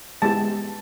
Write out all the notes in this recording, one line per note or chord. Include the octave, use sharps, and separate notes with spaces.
G#3 B3 E4 G4 A5